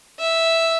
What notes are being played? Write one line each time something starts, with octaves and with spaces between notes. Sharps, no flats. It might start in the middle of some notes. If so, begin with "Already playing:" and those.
E5